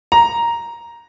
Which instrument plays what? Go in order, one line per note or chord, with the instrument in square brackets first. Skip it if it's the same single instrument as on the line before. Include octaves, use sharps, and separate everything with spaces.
[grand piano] A#5